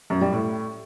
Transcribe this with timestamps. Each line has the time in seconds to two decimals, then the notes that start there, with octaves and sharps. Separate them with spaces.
0.10 F#2
0.21 G3
0.33 A2